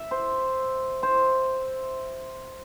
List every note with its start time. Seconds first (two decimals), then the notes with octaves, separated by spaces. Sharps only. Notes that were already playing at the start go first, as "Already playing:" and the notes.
Already playing: E5
0.11 C5
1.03 C5